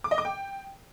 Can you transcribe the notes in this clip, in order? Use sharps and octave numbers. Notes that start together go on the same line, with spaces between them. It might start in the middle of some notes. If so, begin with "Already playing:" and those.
D6
D#5
D6
G5